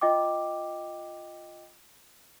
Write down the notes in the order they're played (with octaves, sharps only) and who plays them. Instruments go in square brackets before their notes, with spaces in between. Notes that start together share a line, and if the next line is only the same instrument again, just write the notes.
[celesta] F4 D#5 G5 D6